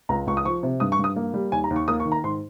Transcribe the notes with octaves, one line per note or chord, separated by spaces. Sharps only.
C#2 A#5
C#2 C#6
D#6
F3 C#6
C3
G2 D#6
C#6
G2 D#6
A#3
G3
D#2 G#5
A#5
D#2
C#6
A#3 D#6
C#6
D#3
A#5
G#2 C6